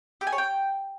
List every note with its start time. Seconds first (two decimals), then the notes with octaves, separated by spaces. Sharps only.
0.21 G4
0.27 G#5
0.32 C#5
0.38 G5